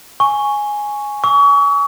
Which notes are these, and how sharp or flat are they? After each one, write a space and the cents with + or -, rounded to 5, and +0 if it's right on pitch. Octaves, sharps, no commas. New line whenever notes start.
G#5 +0 C#6 +0
G#5 +0 C#6 +35 E6 -30